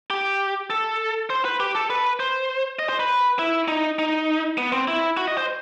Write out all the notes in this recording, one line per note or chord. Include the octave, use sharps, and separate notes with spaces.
G4
A4
C5
B4
G4
A4
B4
C5
D#5
C5
B4
E4
D#4
D#4
B3
C4
E4
F#4
D#5
C5